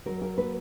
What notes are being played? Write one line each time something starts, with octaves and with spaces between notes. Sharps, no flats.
F#3 A#4
A#4
A#3 B4